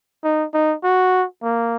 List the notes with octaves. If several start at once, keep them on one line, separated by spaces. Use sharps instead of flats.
D#4
D#4
F#4
A#3